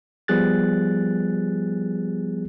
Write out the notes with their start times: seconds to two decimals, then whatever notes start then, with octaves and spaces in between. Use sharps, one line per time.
0.28 F3 G3 B3 G#4 F#6 A6